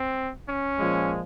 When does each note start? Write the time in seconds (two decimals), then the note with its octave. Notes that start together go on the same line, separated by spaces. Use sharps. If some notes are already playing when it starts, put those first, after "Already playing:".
Already playing: C4
0.49 C#4
0.79 A#2 F3 G#3